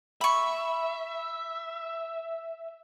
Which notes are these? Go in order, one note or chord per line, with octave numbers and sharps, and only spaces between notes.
E5 B5 C#6